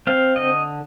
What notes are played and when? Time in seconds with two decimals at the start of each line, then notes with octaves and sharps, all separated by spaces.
0.07 C4 F5
0.36 D3 D#5